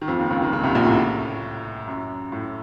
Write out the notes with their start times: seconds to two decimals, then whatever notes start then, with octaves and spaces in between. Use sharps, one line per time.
0.02 D#3
0.08 F2 F3
0.19 D#2 D#3
0.30 C#2 C#3
0.42 D#2 D#3
0.52 C#2 C#3
0.64 C2 C3
0.75 A#1 A#2
0.86 A2
1.87 F#2
2.32 A2